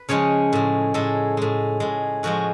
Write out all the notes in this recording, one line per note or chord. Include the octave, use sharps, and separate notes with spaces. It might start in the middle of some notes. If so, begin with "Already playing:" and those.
Already playing: B4
C#3 F3 G#3 C#5
A2 G#3
A2 G#3 A4
A2 G#3
A2 G#3
A2 F3 G#3 F#4